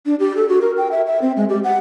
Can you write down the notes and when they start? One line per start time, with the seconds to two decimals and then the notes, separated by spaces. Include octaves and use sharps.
0.06 D4
0.20 G4
0.36 A4
0.49 F#4
0.61 A#4
0.77 G5
0.91 E5
1.06 E5
1.21 C4
1.36 G#3
1.49 G4
1.64 F#5